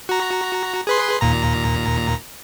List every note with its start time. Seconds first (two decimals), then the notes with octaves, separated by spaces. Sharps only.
0.09 F#4 A#5
0.87 G#4 B4 C6
1.21 D#2 A#2 A#5